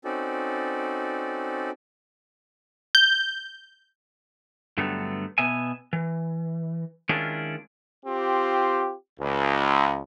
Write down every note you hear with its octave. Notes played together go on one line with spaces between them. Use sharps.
C4 C#4 D#4 F#4 A4 D5
G6
G2 D3 F#3 G3 A3 B3
B2 B3 E5 G#5
E3
D#3 G#3 C#4 D4 E4 F4
C4 F4 G4
C#2